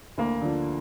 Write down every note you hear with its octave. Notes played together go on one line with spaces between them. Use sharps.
D2 A#3
D3 F3